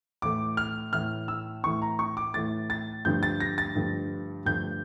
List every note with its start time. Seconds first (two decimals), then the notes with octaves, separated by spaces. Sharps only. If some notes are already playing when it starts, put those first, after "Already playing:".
0.22 A2 E3 A3 D6
0.57 F6
0.93 A2 E3 A3 F6
1.28 E6
1.64 A2 E3 A3 C#6
1.82 A#5
1.99 C#6
2.17 D6
2.34 A2 E3 A3 A6
2.70 A6
3.05 G2 D3 F3 A3 G6
3.23 A6
3.40 A#6
3.58 A6
3.75 G2 D3 F3 A3
4.46 G2 D3 F3 A3 G6